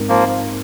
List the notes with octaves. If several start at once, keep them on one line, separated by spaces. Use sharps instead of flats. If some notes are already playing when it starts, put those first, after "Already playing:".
Already playing: G#2 G#3 C4 D#4 A#4
F3 A#3